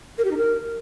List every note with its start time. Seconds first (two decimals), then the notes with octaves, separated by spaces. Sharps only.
0.18 A#4
0.25 G4
0.31 D#4
0.37 A#4